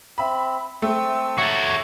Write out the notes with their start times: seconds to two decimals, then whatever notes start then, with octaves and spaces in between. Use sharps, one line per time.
0.18 C4 E5 B5
0.82 A3 C4 E6
1.38 F#4 A4 C#5 E5 A#5 C#6